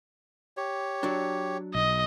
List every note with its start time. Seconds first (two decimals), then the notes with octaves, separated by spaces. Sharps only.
0.57 G4 C#5
1.03 F#3 D4
1.75 B1 D#5